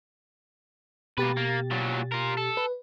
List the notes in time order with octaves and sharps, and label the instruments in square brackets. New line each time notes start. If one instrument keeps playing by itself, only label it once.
[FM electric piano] B2 G4 A6 [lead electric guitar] A#3 B4
[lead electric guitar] A#3
A#2 F#3
F4 A#4
A4
[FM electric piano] B4